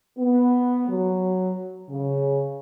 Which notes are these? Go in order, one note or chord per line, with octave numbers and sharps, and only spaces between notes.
B3
F#3
C#3